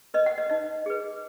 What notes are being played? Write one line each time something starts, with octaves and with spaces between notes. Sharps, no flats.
B4 D#5
F#5
D#5
D#4 D#5
G#4 B4